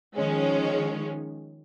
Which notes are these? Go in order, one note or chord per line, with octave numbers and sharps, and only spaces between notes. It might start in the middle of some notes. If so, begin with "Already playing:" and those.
D#3 F3 G#3 C#4